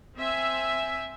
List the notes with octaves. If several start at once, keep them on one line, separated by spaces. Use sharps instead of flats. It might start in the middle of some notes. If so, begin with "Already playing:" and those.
C4 E5 G#5